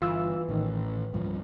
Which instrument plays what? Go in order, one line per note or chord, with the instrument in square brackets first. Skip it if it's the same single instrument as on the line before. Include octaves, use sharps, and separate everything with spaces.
[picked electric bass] G1 [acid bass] E3 [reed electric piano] F4 E6
[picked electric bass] A1 [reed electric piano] A2 D#3
[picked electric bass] C2 G2 F3